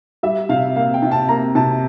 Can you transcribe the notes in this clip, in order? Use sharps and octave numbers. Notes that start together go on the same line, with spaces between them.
G3 E5
C3 F5
A#3 F5
G5
C3
A5
A#3 A#5
C3 A5